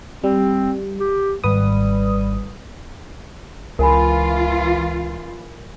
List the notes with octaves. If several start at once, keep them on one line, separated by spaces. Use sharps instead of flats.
G3 C4
G4
G#1 G3 B4 D#6
C#2 E3 F4 A#4 G#5 B5